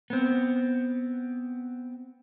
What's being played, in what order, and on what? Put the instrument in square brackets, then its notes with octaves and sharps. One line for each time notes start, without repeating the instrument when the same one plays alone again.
[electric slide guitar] B3 C4